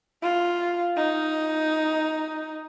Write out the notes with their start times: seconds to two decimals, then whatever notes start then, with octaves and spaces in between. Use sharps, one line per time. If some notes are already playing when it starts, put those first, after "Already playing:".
0.23 F4
0.97 D#4